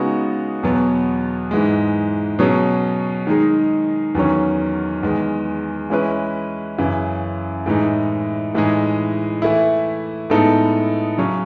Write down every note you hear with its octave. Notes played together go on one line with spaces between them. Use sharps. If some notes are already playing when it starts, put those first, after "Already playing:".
Already playing: C#3 G#3 B3 D#4 F#4
E2 B2 F#3 B3
G#2 E3 G#3
B2 F#3 C#4 G#4
D#3 G#3 D#4 G#4
E2 D#3 F#3 C#4
E2 D#3 G#3
E3 G#3 C#4 E4 B4
F#2 C#3 E3
A2 E3 G#3 D#4
A2 E3 G#3 D#4 G#4
E3 A3 E4
A2 G#3 B3 D#4 A4
C#3 F#3 C#4